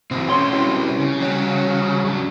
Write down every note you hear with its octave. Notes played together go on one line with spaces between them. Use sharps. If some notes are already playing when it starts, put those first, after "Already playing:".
B1 E3 C4
A3 C#4 C#5 C6
C4 E4 G4
C#3
G3 F#4 C#5
F#3 D4